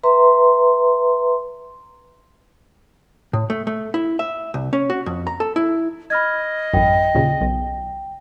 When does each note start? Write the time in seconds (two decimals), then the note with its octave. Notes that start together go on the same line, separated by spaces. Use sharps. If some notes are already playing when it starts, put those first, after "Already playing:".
0.03 B4 E5 A#5 C6
3.33 A2
3.50 A3
3.67 A3
3.94 E4
4.19 E5
4.54 C2
4.73 C#4
4.90 F#4
5.06 F2
5.27 A#5
5.40 A4
5.56 E4
6.10 D#5 B5 F6 G#6
6.73 A1 F#2 G5
7.15 D#2 A#2 C#3
7.41 B1